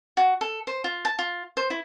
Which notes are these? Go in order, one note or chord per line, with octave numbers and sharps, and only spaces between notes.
F#4
A4
C5
F4
A5
F4
C5
E4